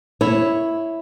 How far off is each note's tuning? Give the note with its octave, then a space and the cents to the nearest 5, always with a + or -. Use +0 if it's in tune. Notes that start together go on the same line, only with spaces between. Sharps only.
E4 +0 C#5 +0